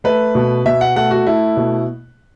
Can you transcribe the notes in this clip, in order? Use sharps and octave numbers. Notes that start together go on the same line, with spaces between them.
A3 B4
B2
B2 E5
F#5
A3 F#5
F#4
A3 E4
B2